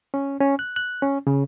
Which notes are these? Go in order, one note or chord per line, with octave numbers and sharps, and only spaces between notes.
C#4
C#4
F#6
F#6
C#4
C#3